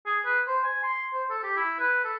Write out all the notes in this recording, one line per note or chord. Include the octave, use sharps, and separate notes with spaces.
G#4
B4
C5
G#5
C6
C5
A4
G4
E4
B4
A4